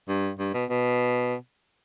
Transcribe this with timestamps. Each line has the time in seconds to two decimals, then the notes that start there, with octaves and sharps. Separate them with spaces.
0.08 G2
0.39 G2
0.54 B2
0.70 B2